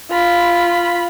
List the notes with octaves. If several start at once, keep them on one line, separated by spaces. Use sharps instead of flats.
F4 B5